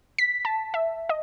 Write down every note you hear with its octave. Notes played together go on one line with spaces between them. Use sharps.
B6
A5
E5
D#5